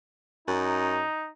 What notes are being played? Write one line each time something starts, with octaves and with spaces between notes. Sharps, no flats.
F#2 D#4